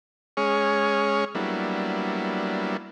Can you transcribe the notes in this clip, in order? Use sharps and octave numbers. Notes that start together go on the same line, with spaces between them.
G#3 C#4 G#4 C#5 C#6 F6
F#3 G3 A#3 B3 D4 E4